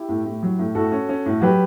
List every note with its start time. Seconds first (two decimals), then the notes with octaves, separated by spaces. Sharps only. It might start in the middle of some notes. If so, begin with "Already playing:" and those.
Already playing: E4 G4
0.09 A2
0.25 A2
0.43 F#3
0.59 A2
0.75 A2 F#4 A4
0.92 C#4
1.09 C#4
1.26 A2
1.41 F#3 G4 B4